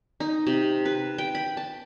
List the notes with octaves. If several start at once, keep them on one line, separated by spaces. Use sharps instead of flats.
D#4
C3
B4
G5
B5
A5